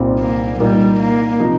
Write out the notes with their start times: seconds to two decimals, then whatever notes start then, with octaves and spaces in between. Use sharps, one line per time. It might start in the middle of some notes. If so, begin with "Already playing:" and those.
Already playing: C2 A#2 G3 C4 D#4
0.19 A#3
0.60 A#2 G3 A#3 D#4
1.00 A#3
1.40 C3 F3 D#4